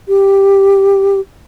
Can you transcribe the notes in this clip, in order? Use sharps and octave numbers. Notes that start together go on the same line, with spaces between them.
G4